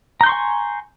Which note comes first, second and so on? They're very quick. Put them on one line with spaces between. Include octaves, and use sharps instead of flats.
A#5 G6 C6 C#6 G#5